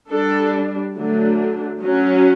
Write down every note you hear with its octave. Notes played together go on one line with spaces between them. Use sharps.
G3 D4 A4
D3 F#3 A3 D4
F#3 C#4